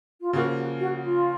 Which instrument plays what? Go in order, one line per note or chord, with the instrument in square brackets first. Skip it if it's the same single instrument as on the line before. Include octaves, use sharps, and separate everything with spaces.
[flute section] F4
[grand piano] C#3 F3 A#3 [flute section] F#4
[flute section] F#4
F#4
F4